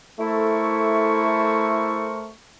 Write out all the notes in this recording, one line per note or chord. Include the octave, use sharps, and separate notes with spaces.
A3 E4 A4 A#4 C5 C#6